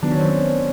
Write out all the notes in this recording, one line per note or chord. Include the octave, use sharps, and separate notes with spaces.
D#3 F#3 B3 D4
C#4
C4